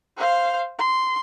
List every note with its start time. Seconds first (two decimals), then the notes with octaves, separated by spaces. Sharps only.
0.17 C5 F5
0.79 C6